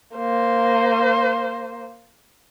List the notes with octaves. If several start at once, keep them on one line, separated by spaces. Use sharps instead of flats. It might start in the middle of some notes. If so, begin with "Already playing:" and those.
A#3 C5